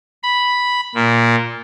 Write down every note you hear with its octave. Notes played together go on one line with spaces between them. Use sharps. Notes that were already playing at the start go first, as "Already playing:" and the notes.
B5
A#2